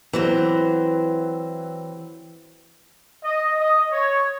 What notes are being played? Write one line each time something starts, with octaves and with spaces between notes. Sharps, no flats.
E3 F#3 C4
D#5
D#5
C#5